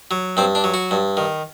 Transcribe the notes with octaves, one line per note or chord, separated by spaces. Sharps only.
F#3
G2 C4
D4
F#3
F#4
G2
D#3